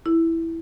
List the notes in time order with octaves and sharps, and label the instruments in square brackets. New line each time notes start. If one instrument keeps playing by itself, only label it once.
[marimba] E4